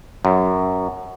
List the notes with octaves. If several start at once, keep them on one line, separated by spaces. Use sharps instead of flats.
F#2